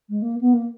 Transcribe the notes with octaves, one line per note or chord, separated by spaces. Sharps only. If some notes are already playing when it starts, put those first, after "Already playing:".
G#3
A#3
B3
A#3